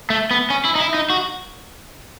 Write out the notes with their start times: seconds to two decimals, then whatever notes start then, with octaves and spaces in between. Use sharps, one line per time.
0.10 A3
0.31 B3
0.50 C#4
0.65 E4
0.75 D#4
0.80 E4
0.94 D#4
1.10 F#4